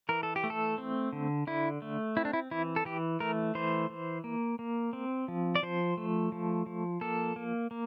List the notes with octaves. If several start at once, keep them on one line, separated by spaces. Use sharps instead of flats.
E3 A#4
A4
G4
A3
A4
C4
D3
D3 E4
A3
C4 E4
D4
E4
E3 E4
A4
E3 G4
A3 A#4
E3 C5
E3
A#3
A#3
C4
F3
D5
F3 C5
A3
F3
F3
A#3 A4
A#3
A#3